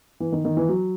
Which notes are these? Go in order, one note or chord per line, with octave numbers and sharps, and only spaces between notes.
E3
D#3
D#3
E3
F#3